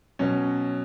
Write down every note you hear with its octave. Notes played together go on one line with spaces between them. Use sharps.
B2 F#3 C#4